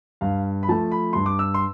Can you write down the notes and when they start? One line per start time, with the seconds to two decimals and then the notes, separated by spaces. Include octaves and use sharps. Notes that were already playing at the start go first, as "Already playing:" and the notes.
0.21 G2 F5
0.63 B5
0.69 F3 A3 A5
0.92 B5
1.13 G2 C6
1.26 D6
1.39 E6
1.54 C6